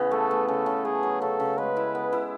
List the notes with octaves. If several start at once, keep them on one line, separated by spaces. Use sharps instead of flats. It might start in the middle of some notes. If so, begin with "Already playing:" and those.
Already playing: C#3 E3 B3
A3 A4
A3
C#3 A4
C#3
A3 G#4
F#3
C#3 A4
C#3
G#3 B4
E4
B3
E4